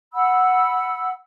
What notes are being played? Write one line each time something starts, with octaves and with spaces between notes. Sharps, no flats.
F#5 B5 E6